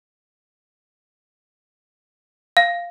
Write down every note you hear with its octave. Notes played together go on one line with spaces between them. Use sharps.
F5